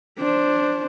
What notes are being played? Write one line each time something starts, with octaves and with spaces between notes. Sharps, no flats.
D4 C5